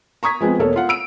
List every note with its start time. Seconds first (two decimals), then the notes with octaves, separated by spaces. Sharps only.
0.23 A#5 C#6 D#6 G#6 B6
0.41 F3 G#3 B3 C4
0.59 E1 A#3 A4 C#5
0.76 F4 F#5
0.89 E6 D7 D#7